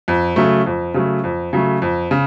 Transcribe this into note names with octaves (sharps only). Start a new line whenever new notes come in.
F2
C#3 F#3 A3
F2
C#3 F#3 A3
F2
C#3 F#3 A3
F2
C#3